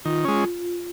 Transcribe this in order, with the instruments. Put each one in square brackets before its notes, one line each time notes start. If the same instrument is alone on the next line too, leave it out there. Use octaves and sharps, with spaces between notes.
[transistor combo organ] D#3 [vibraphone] F4
[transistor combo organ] G#3 C#4